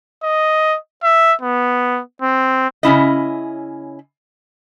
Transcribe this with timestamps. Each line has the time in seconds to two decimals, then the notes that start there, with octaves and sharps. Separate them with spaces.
0.23 D#5
1.03 E5
1.41 B3
2.22 C4
2.83 C#3 C#4 E4 D#5